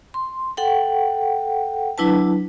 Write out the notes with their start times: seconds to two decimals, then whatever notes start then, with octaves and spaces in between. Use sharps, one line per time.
0.14 C6
0.57 A4 F#5 G5
1.98 F#3 D4 E4 B4 A5